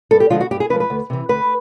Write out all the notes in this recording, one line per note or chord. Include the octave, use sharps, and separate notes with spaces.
G2 A4
G4
D3 F3 G#3 F4
F#4
G2 G4
G#4
D3 B4
F3 G#3
B4
D2
C3 E3
D2 B4